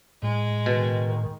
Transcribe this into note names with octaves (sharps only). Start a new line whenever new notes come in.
A2 G#3
B2 D#3